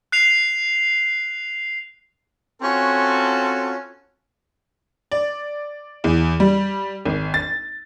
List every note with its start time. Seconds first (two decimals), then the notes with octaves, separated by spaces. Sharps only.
0.12 F#6 C7 F7
2.62 C4 C#4 F4 F#4 A4
5.11 D5
6.04 E2
6.40 G3
7.05 G#1
7.34 A6